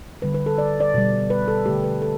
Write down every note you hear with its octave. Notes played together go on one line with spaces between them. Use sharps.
D3 G3 B4
B4
A4
D5
D5
B2 G3
B4
A4
D3 A3 G4
B4
A4